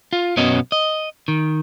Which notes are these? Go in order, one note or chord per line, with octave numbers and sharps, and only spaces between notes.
F4
B1 F#2 B3 C#4 F#4 D#5
D#5
D#3